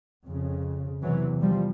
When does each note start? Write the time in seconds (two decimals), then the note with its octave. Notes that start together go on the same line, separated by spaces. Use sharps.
0.23 F2 C#3
1.03 E2 C3 E3 F#3
1.42 F3 G3